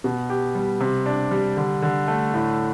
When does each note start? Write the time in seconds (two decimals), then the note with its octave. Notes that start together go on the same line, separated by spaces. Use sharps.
0.04 B2
0.30 G4
0.55 G3
0.80 C3
1.06 D4
1.31 G3
1.57 D3
1.82 D3
2.08 A3
2.33 A2